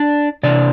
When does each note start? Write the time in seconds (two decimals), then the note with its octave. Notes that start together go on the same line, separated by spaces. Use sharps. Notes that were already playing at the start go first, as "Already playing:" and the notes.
Already playing: D4 D5
0.43 C3 E3 A#3 D4 D5